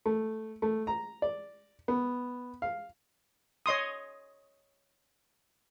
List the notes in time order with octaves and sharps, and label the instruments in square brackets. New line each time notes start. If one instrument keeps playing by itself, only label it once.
[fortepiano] A3
A3
A#5
D5
B3
F5
[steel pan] C#5 D#5 C6 D#6